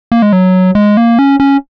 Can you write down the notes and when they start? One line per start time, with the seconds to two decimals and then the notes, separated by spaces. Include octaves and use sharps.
0.12 A#3
0.22 G#3
0.33 F#3
0.75 G#3
0.97 A#3
1.19 C#4
1.40 C#4